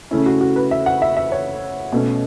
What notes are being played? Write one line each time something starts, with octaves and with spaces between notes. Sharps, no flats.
C#3 A3 C#4 E4
F#4
F#4
B4
E5
F#5
E5
E5
C#5
B2 A3 C#4